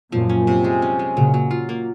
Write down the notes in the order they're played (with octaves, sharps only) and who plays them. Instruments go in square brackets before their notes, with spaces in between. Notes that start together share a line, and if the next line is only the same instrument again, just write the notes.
[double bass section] F#2 A#2 [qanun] F3
[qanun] C#4
C3
G#3
C#4
G#3
[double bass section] A#2 C#3 [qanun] F#3
[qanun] F#3
F4
A#3